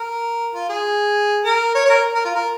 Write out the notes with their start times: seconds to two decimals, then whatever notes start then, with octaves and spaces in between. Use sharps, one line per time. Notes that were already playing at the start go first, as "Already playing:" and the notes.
Already playing: A#4
0.54 F4
0.69 G#4
1.44 A#4
1.75 C#5
1.85 C#5
1.89 A#4
2.15 A#4
2.25 F4
2.35 A#4